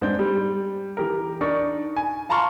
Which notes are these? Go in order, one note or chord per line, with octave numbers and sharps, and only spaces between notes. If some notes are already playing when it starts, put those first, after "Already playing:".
G#2 C4 D4 G6
G3
E3 G4 A#4
D4 D#4 A#4 D5 C#6
G#5
F5 A5 A#5 C6 C#6 F6